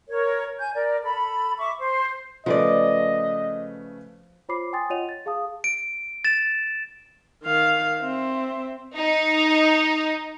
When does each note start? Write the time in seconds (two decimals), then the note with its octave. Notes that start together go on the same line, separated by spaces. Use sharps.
0.08 A#4 C#5
0.59 G#5 G6
0.74 A#4 D5
1.04 A4 B5
1.58 E5 C#6 D6
1.79 C5
2.46 C#3 F3 A3 B4 D5 D#5
4.49 F4 C5 C#5 B5 D6 C7
4.73 G5 G#5 C6 D#6 A6
4.90 F4 C#5 D#5 F#5 D#7 F7
5.09 A6
5.26 G#4 F5 A5 D#6
5.64 D7
6.25 A6 E7
7.44 D#3 F5
8.01 C4 E5
8.95 D#4